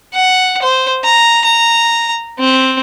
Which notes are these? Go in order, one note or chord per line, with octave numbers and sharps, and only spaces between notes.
F#5
C5
A#5
A#5
C4